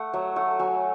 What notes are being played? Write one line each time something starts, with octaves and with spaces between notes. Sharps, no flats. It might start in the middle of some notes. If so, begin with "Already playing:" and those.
Already playing: A3 A4 F#5
F#3 E5
A3 F#5
F#3 G#5